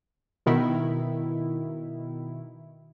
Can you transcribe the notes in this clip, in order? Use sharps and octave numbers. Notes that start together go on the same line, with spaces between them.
B2 D#3 E4